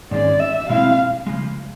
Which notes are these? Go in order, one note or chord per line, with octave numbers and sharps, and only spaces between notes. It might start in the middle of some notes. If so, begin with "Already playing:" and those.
G#2 D#3 G#3 C#4 D5
E5
B2 G#3 C4 E4 F5
C#3 F3 G#3